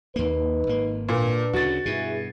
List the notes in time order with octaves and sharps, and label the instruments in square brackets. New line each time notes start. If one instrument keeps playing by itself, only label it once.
[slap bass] D#2 A#3 [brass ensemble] D#4 B4
[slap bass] G#1 A#3
[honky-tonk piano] A#2 [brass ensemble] D4 B4
[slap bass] D2 C#3 [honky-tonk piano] F#4 A6
[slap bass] G2 B2 [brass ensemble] E4 G#4